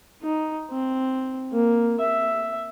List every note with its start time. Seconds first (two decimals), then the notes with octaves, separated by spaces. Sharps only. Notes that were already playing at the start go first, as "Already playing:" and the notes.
0.23 D#4
0.71 C4
1.53 A#3
2.00 E5